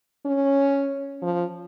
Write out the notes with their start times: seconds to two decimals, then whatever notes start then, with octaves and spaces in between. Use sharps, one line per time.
0.26 C#4
1.22 F3